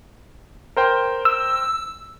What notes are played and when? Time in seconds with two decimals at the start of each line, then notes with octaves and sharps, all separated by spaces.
0.76 A#4 C5 G5
1.25 E6